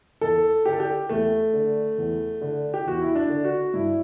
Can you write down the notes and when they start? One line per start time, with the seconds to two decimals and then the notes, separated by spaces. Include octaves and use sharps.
0.21 E2 A4
0.66 D3 G4
0.73 A4
0.80 G4
1.09 E2 A3
1.54 D3
1.98 E2
2.41 D3
2.74 G4
2.86 E2 F#4
3.01 E4
3.15 D4
3.29 D3
3.45 F#4
3.74 G2 E4